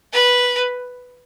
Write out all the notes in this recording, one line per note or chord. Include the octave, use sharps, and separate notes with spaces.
B4